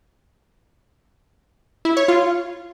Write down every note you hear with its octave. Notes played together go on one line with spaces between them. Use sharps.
E4
C#5
F4